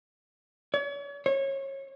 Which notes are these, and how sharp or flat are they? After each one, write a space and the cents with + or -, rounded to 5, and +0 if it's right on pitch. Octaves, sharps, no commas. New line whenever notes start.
C#5 +40
C#5 -25